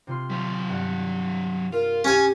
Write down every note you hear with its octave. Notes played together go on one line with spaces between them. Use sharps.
C3 F4 C6
F#3 C5
G2 F#5
F4 A#4
C#4 G4 G#5